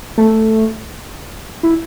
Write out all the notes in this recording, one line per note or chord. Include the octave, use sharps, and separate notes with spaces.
A3
E4